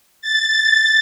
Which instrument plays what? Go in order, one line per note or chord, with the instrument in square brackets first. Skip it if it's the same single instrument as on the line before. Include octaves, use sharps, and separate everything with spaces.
[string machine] A6